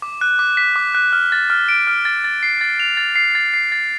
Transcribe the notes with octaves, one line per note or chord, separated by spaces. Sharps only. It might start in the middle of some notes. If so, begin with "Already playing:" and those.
D6
F#6
D6
B6
D6
F#6
F6
A6
F6
D7
F6
A6
A6
C7
A6
F7
A6
C7
A6
C7
A6